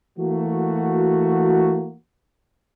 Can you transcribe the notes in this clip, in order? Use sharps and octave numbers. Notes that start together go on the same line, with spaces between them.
E3 A3 A#3 F#4